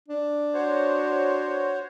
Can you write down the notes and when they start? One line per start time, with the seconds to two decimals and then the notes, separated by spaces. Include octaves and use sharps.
0.08 D4
0.54 F#4 C5 C#5